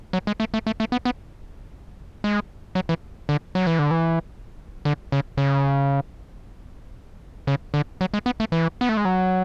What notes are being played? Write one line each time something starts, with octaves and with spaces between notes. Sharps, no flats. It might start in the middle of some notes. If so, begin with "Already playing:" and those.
F#3
G#3
A3
A3
A3
A3
B3
B3
G#3
F#3
E3
D3
F#3
E3
D3
E3
D3
C#3
C#3
C#3
D3
F#3
G#3
B3
A3
E3
B3
A3
G#3
F#3